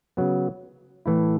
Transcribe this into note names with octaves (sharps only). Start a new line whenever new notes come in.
C#3 F#3 B3
A2 E3 A3 E4